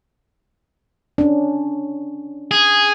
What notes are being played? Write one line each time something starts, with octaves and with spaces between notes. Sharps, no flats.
C#4 D4
G#4